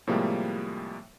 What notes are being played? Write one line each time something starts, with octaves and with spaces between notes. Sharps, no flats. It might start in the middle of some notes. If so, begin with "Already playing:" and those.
A2 C3 F3 G3 G#3 A#3